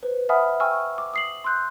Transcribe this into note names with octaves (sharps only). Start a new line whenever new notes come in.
B4 C5
E5 F#5 G#5 B5 D#6 F6
G5 G#5 C#6 E6 F6
D6
D#6 C7 F#7
C6 E6 F#6 G6